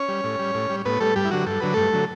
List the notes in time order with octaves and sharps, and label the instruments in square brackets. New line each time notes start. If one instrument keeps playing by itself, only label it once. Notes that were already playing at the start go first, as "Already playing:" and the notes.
Already playing: [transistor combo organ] C#4 C#5
G3
A2
G3
A2
G3
A2 B3 B4
G3 A3 A4
G2 G3 G4
E4
D3 F#3 F#4
G2 A4
D3 F#3 B4
G2 A3 A4
D3 F#3